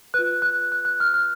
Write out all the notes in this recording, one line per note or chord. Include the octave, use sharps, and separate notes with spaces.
F4 B4 F#6
F#6
F#6
F#6
F6
F6